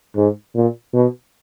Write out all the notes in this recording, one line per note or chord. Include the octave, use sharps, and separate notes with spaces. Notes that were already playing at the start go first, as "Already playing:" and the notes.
G#2
A#2
B2